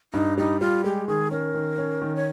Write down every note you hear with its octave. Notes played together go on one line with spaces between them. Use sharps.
G2 D#4
G3 D#4
G3 F4
G#3 G4
D#3 G#4
C#4 A#4
D#3
C#4
D#3
C#5